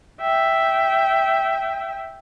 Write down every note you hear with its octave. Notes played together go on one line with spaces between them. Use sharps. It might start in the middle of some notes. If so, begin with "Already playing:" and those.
E5 G5